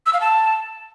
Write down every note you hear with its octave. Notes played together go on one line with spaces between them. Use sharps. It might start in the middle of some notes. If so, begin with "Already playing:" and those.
E6
F5
A5